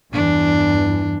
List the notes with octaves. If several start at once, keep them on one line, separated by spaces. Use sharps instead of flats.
E2 G2 E3 D4